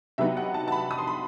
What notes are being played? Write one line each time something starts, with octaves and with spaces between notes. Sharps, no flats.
C3 F#3 B3 D#4 E5
F#5
A5
A5
B5
D#6
C6
B5